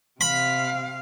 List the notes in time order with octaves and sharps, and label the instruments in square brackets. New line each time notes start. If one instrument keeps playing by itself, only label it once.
[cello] C3 F5 [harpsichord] B5